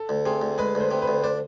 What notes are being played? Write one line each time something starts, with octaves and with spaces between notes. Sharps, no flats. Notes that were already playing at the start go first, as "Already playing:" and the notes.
Already playing: A4
D2
C3 G#4
D2
G#3 B4
D2 C5
C3
B4
D2
D4 C5